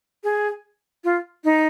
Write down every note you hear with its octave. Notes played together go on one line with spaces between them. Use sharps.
G#4
F4
D#4